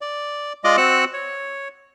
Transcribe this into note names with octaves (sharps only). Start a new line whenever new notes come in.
D5
G#3 F4 D5 D#5 D6
C4 F#4 F#5 E6 F#6
C#5